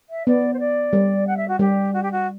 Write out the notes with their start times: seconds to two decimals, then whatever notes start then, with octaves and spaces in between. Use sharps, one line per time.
0.09 E5
0.26 B3 D5
0.53 C5
0.59 D5
0.93 G3
1.27 F#5
1.36 E5
1.48 F#4
1.59 G3 G4
1.93 F#4
2.02 G4
2.11 F#4